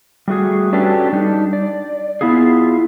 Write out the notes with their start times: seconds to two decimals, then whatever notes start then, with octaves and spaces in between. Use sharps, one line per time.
0.28 G3 A3 F#4 G#4
0.73 C#4 D4 F#4 G4 A4 B4
1.13 G3 D4 D#4
1.53 D5
2.21 B3 E4 F4 G#4